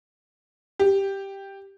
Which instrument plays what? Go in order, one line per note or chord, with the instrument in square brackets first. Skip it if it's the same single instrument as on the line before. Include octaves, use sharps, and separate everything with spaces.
[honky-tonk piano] G4